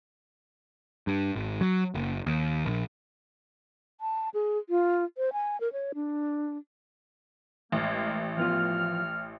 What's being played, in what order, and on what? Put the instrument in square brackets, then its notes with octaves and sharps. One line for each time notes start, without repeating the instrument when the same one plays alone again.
[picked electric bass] G2
G#1
F#3
F#1
D#2
A#1
[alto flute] A5
G#4
F4
C5
G#5
A#4
C#5
D4
[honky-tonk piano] A1 [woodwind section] G#3 A#3
[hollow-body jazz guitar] F3 B3 F4 [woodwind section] F6